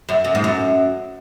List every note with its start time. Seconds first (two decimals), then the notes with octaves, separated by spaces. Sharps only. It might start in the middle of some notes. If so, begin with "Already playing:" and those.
0.09 F#2
0.25 F#2
0.35 G#2
0.44 F#2